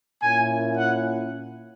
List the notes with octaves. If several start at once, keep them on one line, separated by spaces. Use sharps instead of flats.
A#2 A#3 C#4 E4 G#5
F#5